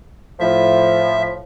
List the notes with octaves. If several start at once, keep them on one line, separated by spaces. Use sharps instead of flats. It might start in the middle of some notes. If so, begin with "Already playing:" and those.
A2 F3 E5